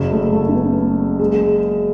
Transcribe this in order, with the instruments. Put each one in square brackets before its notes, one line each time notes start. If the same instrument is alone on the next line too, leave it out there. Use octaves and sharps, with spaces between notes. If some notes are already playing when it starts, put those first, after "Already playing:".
Already playing: [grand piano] F#1 F#2 C#3
[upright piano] A3
A3
C#4
B3
G#3